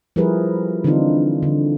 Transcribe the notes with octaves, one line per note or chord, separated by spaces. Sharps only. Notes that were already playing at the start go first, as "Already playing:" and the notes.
F3 G3 E4 G#4 A#4 B4
D3 E3 C4 D4 D#4 F4
D3